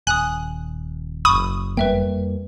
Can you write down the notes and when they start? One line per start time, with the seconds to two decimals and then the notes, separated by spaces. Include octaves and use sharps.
0.07 D#1 G#5 D#6 F#6
1.25 F#1 B5 C#6 D#6
1.77 F2 G3 A#3 B4 E5 G5